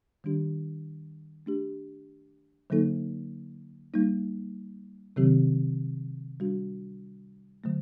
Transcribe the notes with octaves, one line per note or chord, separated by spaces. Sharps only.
D#3 G3 D4 G4
A3 D4 G4
D3 F#3 A#3 D#4 A4
G3 A#3 D#4
C3 D#3 F#3 C4 G4
G3 D4 F#4
D3 F#3 A3